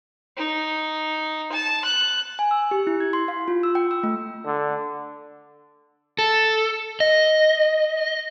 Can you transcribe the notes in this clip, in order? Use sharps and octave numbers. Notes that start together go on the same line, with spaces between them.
D#4
A5
F#6
G#5
E6
G4
E4
G#6
C6
F5
F4
E6
G5
E6
A3
D3
A4
D#5